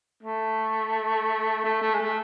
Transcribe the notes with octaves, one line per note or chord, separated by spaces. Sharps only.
A3
A3
A3
G#3
A3